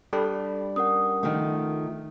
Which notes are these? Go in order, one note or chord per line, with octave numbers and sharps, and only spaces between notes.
G3 D4 A4 G5 B5
C#4 A#4 F#5 D#6
D#3 F3 A3